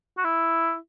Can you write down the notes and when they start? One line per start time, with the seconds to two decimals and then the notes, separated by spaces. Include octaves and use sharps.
0.18 F#4
0.25 E4